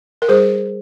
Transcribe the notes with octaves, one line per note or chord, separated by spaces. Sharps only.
A#4
G3 G#4 C5